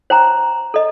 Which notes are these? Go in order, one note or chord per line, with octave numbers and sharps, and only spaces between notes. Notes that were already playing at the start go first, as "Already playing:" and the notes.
C5 G5 A#5
A4 D#5